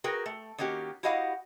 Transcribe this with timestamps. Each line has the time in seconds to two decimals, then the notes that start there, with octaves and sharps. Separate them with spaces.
0.04 F#4 G#4 A#4 B4 G5
0.26 A3
0.58 D#3 A#3 C#4 F#4 G4
1.03 E4 F#4 G4 D#5 F5 F#5